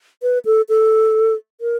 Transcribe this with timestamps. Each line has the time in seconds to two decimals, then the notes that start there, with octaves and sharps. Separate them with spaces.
0.22 B4
0.45 A4
0.69 A4
1.61 A#4